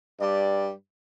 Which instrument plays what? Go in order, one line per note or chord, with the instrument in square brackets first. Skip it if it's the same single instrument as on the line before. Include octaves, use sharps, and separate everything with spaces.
[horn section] G2 G3 D5